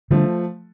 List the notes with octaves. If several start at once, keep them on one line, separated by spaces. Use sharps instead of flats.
D3 F3 G3 A3 D4